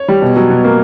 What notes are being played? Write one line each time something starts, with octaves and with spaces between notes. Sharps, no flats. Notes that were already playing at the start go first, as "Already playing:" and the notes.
Already playing: C#5
G3
B2
F#3
B2
A#3